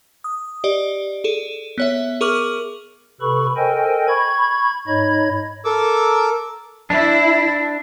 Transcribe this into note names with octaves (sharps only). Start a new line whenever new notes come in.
D#6
G4 D5 D#5
G#4 A4
B3 C#5 E5
G#4 A#4 C#6 D6 F6 F#7
C3 A4 B4 B5 C#6
A4 A#4 C5 D#5 G5 G#5
B5 C#6 G#6
G#2 D#4 C#5 D#5 B5 G#6
A4 A#4 D6 E6
D4 E4